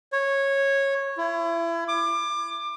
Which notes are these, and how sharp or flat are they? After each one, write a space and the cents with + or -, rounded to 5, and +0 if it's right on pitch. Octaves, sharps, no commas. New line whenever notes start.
C#5 -10
E4 +30
D6 +25